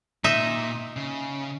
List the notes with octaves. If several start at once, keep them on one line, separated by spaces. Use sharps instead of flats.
A#2 D#4 E5
C#3